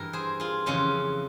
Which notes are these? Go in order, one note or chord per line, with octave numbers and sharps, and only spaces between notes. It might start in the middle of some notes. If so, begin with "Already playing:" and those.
Already playing: G2 E3 A#4
G#4 C5
F4 G#4
F2 C#3 E3 C#4 F4